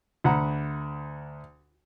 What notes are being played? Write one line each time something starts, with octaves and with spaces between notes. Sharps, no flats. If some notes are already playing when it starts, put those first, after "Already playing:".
D2 F#5 A#5 B5